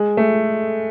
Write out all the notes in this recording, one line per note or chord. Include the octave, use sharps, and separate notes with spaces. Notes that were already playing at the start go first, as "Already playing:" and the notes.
Already playing: G#3
A3